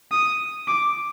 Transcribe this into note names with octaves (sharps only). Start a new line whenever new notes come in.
D#6
D6